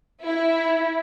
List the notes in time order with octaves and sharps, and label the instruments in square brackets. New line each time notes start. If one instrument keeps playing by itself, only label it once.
[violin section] E4